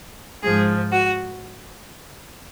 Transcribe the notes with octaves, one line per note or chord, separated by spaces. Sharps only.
G#2 F3 G#4
F#4